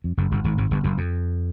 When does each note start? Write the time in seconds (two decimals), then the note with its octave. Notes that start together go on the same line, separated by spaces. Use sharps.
0.04 F2
0.17 F#1 F#2
0.31 G1 G2
0.44 G#1 G#2
0.58 G#1 G#2
0.71 G1 G2
0.84 F#1 F#2
0.98 F2